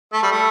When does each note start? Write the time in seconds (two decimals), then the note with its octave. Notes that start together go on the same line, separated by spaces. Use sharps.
0.12 A3
0.22 G3
0.31 A3